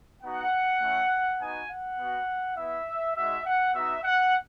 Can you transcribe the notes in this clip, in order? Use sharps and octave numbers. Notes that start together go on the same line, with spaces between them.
B3 D#4 F#4 F#5
A3 C#4 E4
B3 D#4 F#4 G#5
F#5
B3 F#4
B3 E4 E5
G#3 D#4 F#4 E5
F#5
B3 D#4 F#4 E5
F#5